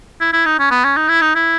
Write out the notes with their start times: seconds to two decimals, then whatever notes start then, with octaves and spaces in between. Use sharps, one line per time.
0.21 E4
0.33 E4
0.46 D#4
0.59 C#4
0.71 B3
0.84 C#4
0.97 D#4
1.09 E4
1.21 D#4
1.35 E4